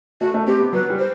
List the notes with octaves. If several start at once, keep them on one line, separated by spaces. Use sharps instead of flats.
A3 F#4
A3
C4 G4
B3
F#3 B4
G3
C5